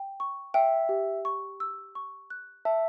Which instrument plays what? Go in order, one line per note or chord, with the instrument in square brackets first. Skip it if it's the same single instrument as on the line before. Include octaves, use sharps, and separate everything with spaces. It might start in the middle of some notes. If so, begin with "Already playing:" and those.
Already playing: [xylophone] G5
C#6
[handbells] E5 [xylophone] G5
[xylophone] G4
C#6
E6
C#6
F#6
[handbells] E5 [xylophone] A5